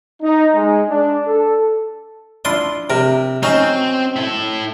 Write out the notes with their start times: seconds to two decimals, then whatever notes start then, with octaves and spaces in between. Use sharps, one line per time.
0.22 D#4
0.55 G#3
0.88 D4
1.26 A4
2.45 D4 E4 F4 C6
2.90 C3 A#4
3.43 F#3 C4 C#4 D#4
4.16 E4 A4